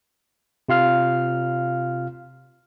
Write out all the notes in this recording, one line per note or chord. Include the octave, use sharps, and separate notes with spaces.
C3 F4 F5 F6